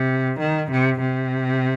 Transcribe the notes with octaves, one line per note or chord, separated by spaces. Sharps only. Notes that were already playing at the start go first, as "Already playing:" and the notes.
Already playing: C3
D#3
C3
C3